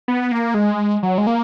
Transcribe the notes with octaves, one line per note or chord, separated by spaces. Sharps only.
B3
A#3
G#3
F#3
G#3
A#3